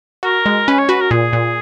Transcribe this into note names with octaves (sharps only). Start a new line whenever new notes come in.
F#4 A#4
G#3
C#4 B4
C#5
F#4 B4
A#4
A#2 G#4
A#2